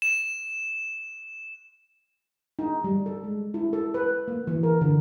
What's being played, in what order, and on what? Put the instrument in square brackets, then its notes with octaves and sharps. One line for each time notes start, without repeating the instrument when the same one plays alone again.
[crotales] E7
[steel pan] D#4
G3
A4
G#3
E4
A4
B4
A#3
E3
A#4
D3